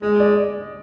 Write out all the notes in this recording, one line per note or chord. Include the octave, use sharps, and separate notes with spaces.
G#3 D#5
D5